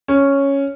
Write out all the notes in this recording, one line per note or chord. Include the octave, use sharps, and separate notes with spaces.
C#4